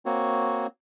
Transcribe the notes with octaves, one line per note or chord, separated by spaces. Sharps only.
A#3 C4 F#4 C#5